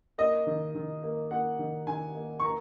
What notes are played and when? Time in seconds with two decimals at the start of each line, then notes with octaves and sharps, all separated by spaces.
0.18 A#3 D#5
0.47 D#3
0.75 D#3
1.03 A#3
1.31 A#3 F#5
1.59 D#3
1.87 D#3 G#5
2.15 A#3
2.40 C#6
2.44 A#3 A#5